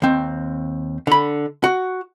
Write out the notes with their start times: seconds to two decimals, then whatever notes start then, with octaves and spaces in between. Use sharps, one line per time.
0.02 D#2 C4
1.07 D3 B5
1.64 F#4